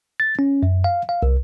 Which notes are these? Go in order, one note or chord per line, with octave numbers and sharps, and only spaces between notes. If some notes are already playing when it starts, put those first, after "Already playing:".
A6
C#4
F#2
F5
F5
C2